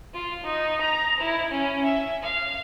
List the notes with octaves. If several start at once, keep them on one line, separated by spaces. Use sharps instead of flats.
F4
D#4
A#5
E4
C#4
E5
F5